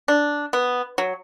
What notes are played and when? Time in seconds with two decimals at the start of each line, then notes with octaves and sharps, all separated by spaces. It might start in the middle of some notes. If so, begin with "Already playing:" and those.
0.08 D4
0.53 B3
0.98 F#3